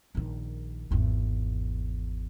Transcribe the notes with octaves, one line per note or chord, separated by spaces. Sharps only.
A#1 D#3
G#1 E2